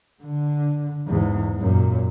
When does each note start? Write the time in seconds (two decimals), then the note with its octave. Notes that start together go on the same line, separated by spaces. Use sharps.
0.23 D3
1.07 E2 G#2
1.59 F#2 A#2